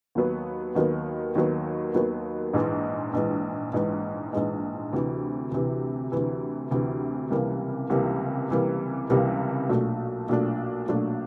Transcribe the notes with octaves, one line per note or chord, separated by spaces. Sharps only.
D#2 D#3 F#3 B3
D#2 D#3 F#3 B3
D#2 D#3 F#3 B3
D#2 D#3 F#3 B3
A#1 G#2 E3 G#3
A#1 G#2 E3 G#3
A#1 G#2 E3 G#3
A#1 G#2 E3 G#3
D2 C3 E3
D2 C3 E3
D2 C3 E3
D2 C3 E3
C#2 C3 E3 G3 A#3
C#2 C3 E3 G3 A#3
C#2 C3 E3 G3 A#3
C#2 C3 E3 G3 A#3
B1 A#2 F#3 A3 D4
B1 A#2 F#3 A3 D4
B1 A#2 F#3 A3 D4